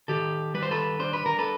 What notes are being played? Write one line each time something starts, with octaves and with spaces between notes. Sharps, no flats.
D#3 G4 A4
G3 B4
C5
A4 B4
D4 C5
B4
A#4
A4 B4